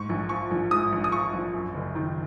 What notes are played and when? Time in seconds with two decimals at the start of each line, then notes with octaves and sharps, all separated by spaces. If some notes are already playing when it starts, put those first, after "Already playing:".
Already playing: G#2 C#6
0.09 A#1
0.29 F3 C#6
0.51 A#1
0.71 G#2 D#6
0.92 A#1
1.04 D#6
1.12 F3 C#6
1.33 A#1
1.53 F#2
1.74 F#1
1.95 D#3